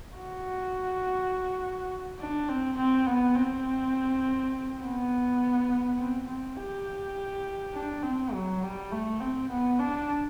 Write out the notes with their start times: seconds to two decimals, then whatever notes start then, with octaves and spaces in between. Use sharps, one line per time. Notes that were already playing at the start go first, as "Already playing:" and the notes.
0.15 F#4
2.20 D4
2.49 C4
2.78 C4
3.07 B3
3.36 C4
4.82 B3
5.99 C4
6.28 C4
6.57 G4
7.75 D4
8.03 C4
8.33 F#3
8.63 G3
8.92 A3
9.21 C4
9.50 B3
9.79 D4